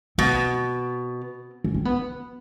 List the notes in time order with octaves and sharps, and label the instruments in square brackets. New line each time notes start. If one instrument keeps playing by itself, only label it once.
[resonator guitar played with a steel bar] B2 [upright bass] C4
[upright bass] C#4
C4
B3